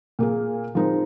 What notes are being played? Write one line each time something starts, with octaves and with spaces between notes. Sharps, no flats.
A#2 A#3 G#4
F3 G#3 C4 D#4 A#4